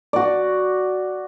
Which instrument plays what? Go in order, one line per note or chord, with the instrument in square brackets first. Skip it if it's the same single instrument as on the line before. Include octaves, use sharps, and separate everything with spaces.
[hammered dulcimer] F#4 D5